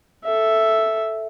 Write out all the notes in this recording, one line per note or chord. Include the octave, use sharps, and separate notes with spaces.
A4 E5